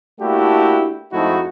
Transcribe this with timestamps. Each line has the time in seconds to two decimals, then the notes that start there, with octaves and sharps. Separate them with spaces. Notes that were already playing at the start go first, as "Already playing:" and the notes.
0.20 A3 A#3 D4 E4 F#4 G4
1.12 F2 G#2 A3 D#4 E4 F#4